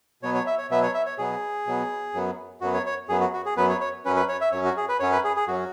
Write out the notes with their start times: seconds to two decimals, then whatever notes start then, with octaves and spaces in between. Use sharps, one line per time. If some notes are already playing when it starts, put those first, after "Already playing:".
0.23 B2 F#3 B3 C#5
0.34 C#5
0.47 E5
0.58 C#5
0.70 B2 F#3 B3 E5
0.83 C#5
0.94 E5
1.06 C#5
1.18 B2 F#3 B3 G#4
1.67 B2 F#3 B3
2.14 F#2 F#3 B3
2.61 F#2 F#3 B3 F#4
2.74 C#5
2.86 C#5
3.09 F#2 F#3 B3 G#4
3.21 F#4
3.33 F#4
3.46 G#4
3.57 F#2 F#3 B3 B4
3.69 C#5
3.81 C#5
4.05 F#2 F#3 C#4 B4
4.16 B4
4.29 C#5
4.41 E5
4.52 F#2 F#3 C#4 C#5
4.65 F#4
4.77 G#4
4.89 B4
5.00 F#2 F#3 C#4 C#5
5.12 B4
5.24 G#4
5.37 G#4
5.47 F#2 F#3 C#4 F#4